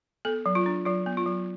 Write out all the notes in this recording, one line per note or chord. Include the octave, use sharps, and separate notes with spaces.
B3 A4
F#3
F4
D4
F#3 F4
B3
F4
F#3